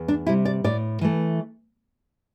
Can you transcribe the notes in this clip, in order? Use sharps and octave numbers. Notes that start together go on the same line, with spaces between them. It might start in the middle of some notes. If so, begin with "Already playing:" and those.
Already playing: E2
D4
C3 G3 E4
D5
A2 D5
E3 A3